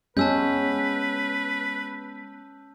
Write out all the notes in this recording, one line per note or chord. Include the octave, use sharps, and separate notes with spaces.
G#3 B3 C#4 G#4 B4 A5 E6 G6